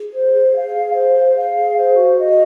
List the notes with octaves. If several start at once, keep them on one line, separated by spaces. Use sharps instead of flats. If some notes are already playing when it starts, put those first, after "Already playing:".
Already playing: G#4
C5
G#4
F5
G#4
C5
G#4
F5
G#4
C5
F#4
D#5